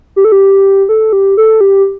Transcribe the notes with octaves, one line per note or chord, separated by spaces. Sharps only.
G4
A4
G4
A4
G4
A4
G4